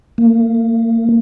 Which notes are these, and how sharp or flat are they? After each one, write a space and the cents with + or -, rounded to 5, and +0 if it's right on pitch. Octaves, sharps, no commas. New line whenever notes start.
A#3 -30